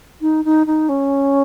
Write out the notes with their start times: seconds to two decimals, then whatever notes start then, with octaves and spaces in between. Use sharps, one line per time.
0.21 D#4
0.45 D#4
0.66 D#4
0.89 C#4